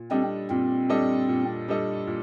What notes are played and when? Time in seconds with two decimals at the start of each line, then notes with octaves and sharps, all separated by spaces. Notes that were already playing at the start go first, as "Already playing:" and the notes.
Already playing: A#2
0.11 G3 C4 D4 A4 D#5
0.50 A#2 C4
0.89 G3 D4 A4 D#5
1.28 A#2
1.68 G3 D4 A4 D#5
2.07 A#2